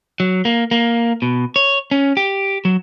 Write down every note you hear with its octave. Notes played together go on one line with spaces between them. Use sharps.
F#3
A#3
A#3
B2
C#5
C#4
G4
F#3